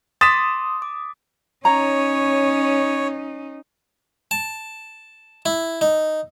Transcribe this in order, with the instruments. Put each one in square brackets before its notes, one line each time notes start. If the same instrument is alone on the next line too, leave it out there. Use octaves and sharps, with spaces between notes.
[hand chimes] C6 D6 [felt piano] D#6 E7 [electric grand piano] A6 B6
[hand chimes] D6
[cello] C#4 D#4 [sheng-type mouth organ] C#5 [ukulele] A#5
[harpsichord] A5
E4
D#4